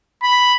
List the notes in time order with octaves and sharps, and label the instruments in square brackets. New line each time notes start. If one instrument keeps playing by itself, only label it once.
[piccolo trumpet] B5